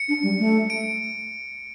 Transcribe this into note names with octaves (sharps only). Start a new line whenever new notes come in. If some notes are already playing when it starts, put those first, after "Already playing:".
Already playing: C#7
D4
G3
A3
D7